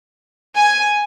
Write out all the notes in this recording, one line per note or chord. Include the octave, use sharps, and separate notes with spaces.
G#5